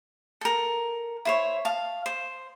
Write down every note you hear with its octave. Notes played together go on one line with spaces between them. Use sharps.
A4 A#4
E4 C5 C#5
F5 A5
C5